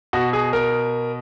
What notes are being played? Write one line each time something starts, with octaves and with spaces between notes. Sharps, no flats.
B2 F#4
G#4
A#4